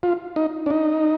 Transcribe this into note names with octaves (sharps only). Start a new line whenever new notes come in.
F4
D#4
D4
D#4